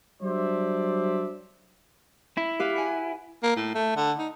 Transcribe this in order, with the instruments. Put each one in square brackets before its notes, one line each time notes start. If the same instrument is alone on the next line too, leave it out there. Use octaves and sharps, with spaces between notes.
[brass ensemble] F#3 G3 D4 C5 D5 E5
[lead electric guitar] E4
[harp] G4 B4 F5
F#5 G#5
[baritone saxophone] A#3
A2
A3
D3
D#4